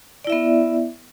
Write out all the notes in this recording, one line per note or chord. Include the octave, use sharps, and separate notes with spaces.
B3 E4 D5 E5